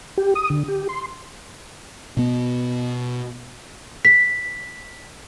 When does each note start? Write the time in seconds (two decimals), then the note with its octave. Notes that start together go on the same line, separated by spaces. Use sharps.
0.18 G4
0.35 D#6
0.50 D3
0.68 G4
0.89 C6
2.17 B2 B3
4.05 B6